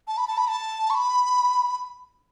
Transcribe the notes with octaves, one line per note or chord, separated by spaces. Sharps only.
A5
B5
A5
B5
A5
C#6
B5